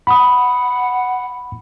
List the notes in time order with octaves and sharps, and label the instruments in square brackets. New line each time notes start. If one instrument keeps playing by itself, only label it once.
[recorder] F#5 [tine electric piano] B5 D#6